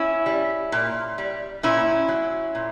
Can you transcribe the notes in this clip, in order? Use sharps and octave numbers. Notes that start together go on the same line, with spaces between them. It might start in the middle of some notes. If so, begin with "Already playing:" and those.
Already playing: C#4 E4
G3
A#2
G3
A#2 C#4 E4
F#3
A#2